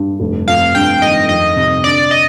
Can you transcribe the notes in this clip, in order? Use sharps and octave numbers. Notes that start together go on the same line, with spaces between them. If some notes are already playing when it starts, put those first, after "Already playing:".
Already playing: G2
F1
F2 F5
G2 G5
D#3 D#5
F2 D#5
C3
D3 D5
D#5